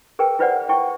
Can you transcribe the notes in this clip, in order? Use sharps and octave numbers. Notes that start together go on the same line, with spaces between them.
G#4 A#4 B4 G5 G#5
E4 F4 B4 C5 D5 F#5
E4 G5 G#5 C#6